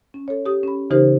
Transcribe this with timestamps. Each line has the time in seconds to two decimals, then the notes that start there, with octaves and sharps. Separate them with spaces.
0.14 C#4
0.28 A4 C#5
0.46 G4 D#6
0.63 C#4 B5
0.90 C#3 E3 D#4 G4 A#4 C5